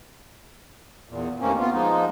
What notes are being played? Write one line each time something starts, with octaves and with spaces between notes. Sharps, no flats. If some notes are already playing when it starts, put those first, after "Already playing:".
E2 A#2
D#2 A2 D#3 A#3 C4 C#4
B3 F4
F3 G#3 A#3 D#4